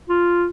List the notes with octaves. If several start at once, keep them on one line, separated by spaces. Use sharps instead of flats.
F4